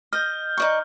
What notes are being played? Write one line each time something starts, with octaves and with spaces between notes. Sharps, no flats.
D#5 F6 G6
D#4 D5 C#6